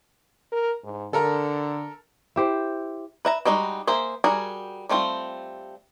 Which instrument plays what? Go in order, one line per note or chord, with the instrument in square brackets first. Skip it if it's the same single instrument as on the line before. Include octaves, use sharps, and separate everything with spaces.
[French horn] A#4
G#2
[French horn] D3 [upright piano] A4 A#4 A#5
[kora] E4 G4 C5
[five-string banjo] B4 E5 A#5
G3 G#3 D#4 F#4
A#3 G#4 C5 E5
G3 F#4 G#4 A#4 G#5
G3 A3 C4 F4